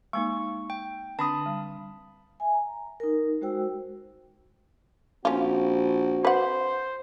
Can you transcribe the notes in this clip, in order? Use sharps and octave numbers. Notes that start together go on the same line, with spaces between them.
G#3 A#3 D#4 C#6
G5
D3 C4 D4 A5 B5 D#6
G3
E5 G#5
A#5
D#4 A#4
G#3 F#4 C5 G5 E6
A#1 C4 C#4 F4 F#4
B4 C5 F#5